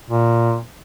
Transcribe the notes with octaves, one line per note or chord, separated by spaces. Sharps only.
A#2